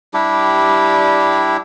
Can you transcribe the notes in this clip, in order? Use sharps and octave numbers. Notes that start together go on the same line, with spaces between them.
G3 D4 E4 G4